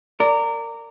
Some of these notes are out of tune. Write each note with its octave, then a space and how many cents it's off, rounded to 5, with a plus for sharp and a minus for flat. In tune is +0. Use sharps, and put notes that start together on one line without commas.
A#4 -20 D5 -5